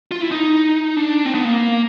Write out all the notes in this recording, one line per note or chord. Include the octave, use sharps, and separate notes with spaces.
F4
E4
D#4
D4
C4
B3
A#3